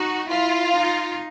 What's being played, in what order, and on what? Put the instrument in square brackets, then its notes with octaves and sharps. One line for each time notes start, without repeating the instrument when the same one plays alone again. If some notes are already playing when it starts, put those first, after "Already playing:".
Already playing: [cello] D#4 [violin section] F#4
[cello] E4 [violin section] F4
[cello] D#4